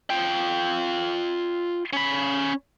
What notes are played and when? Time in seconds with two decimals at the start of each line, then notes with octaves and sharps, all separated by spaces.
0.10 F4 G5
1.93 C#4 B5